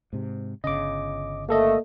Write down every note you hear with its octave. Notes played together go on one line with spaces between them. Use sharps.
G#2 C3
G1 C#3 D#5 D6
A3 A#3 A4 D#5